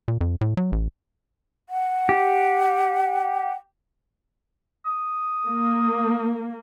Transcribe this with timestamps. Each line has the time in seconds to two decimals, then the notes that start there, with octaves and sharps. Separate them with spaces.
0.08 A#2
0.21 F2
0.41 A2
0.57 F#3
0.72 A1
1.69 F#5
2.09 G4
4.86 D#6
5.47 A#3